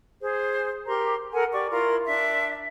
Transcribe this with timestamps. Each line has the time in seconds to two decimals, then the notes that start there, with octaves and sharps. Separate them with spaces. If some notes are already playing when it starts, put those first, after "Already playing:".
0.21 G#4 C5
0.87 G4 A#4 A#5 C6
1.32 A4 A#4 F#5 G#5
1.53 G4 D5 C#6
1.71 E4 F4 A#4 C6
2.06 D4 E5